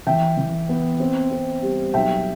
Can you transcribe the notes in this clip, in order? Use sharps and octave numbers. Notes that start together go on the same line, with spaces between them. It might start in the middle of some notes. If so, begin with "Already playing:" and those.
E3 E5 G5
E3
B3
C4
C4
G3
B1 E5 G5